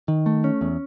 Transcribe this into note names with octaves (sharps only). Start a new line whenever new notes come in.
D#3
A3
C#4
E2